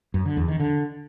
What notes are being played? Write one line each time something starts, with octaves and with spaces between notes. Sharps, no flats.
F#2
D3
E2
D#3
D3